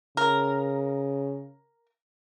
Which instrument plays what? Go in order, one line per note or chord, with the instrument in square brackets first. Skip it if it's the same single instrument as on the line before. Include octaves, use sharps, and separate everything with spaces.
[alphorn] C#3 [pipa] A#4